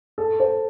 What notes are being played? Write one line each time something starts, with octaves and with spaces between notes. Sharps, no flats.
A4
C5